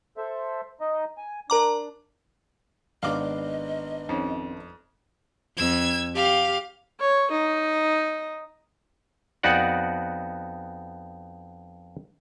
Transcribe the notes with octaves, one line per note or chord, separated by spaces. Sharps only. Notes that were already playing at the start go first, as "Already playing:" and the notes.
A4 C5 E5
D#4 D#5
G#5
D4 A#4 A#5 D6
G#1 B3 D4 D#5 F5 D6
F2 C4 C#4 D#4
F2 E6 G#6
G4 F5
C#5
D#4
F2 B3 D#4 F#4 D5 F#5